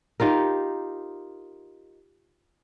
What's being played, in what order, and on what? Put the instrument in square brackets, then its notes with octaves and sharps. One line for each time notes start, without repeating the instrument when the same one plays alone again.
[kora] D#4 F4 G4 A#4